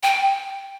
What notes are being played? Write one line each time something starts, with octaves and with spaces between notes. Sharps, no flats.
G5